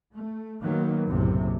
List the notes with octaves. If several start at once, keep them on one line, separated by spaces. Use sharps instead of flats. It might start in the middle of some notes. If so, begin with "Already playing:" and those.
A3
D#3 F#3 A#3 B3
F#1 B1 A2 C3